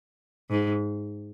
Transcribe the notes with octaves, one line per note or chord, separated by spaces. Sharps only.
G#2